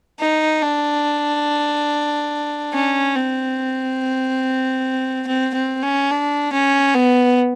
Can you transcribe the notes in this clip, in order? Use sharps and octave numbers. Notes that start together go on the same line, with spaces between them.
D#4
D4
C#4
C4
C4
C4
C#4
D4
C#4
B3